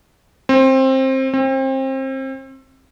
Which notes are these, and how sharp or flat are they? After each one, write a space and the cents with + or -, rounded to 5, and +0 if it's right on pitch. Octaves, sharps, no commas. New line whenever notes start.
C4 +20
C4 +30